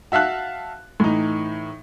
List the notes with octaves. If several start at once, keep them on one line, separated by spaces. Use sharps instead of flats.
F#4 E5 F5 A5 F#6
A2 E3 D#4